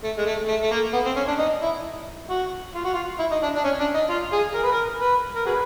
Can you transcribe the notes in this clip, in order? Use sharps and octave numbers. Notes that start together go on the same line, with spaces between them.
A3
G#3
A3
A3
A3
A#3
B3
C4
C#4
D4
D#4
E4
F#4
F4
F#4
F4
E4
D#4
D4
D4
C#4
D4
D#4
F4
G#4
A#4
B4
A#4
B4
A#4
F#4 G#4 B4